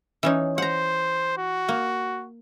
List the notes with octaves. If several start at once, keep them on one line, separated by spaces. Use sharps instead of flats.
E3 C#4 D#4
C5 F#5 A#5
F#4
A#3